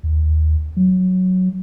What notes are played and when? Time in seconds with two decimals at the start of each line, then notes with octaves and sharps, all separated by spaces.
0.03 D#2
0.77 F#3